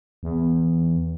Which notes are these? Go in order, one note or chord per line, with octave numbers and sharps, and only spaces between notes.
E2